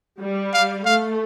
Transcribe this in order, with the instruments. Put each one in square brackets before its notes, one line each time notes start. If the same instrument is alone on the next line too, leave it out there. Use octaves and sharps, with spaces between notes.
[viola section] G3
[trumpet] F5
[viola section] A3 [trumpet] F5